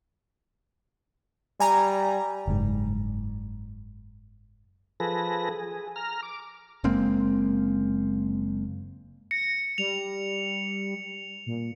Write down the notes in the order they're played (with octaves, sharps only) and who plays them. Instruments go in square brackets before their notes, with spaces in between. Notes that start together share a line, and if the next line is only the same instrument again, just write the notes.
[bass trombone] G3 [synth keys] G#5 A#5
[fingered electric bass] F#1 G#2
[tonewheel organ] F3 G#4 A4 B4 A#6
G#4
A#5 F6
D6
[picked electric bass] F#1 G#3 A#3 C4
[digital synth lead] A#6 [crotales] C#7
[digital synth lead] G3 [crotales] F7
[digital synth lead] A#2